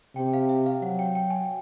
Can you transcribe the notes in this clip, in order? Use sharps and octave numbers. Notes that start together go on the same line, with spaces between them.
C3 G5
F5
E5
F5
F#3 F#5
G5
G5
G#5